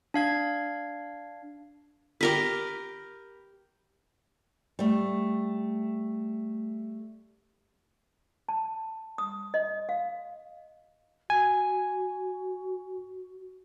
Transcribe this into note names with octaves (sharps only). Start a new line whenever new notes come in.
D4 F5 G#6
G4 A#4 B4
G3 A3
A5
D#6
D#5
F5
F#4 G#5